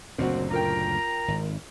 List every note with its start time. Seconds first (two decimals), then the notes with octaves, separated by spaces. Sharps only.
0.18 F#1 D2 A#2 C4 F#4
0.51 F4 A#4 G5 A#5
1.28 G#1